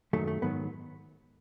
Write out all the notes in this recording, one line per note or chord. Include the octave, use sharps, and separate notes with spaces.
F#2 D#3 F#3 A3
A3
G#2 D#3 F#3 B3